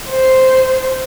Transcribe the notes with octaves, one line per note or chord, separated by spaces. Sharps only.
C5